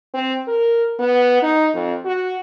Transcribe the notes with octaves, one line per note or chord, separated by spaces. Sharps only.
C4
A#4
B3
D#4
F2
F#4